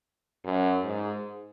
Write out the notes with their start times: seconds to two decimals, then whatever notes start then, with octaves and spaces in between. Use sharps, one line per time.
0.45 F#2
0.84 G#2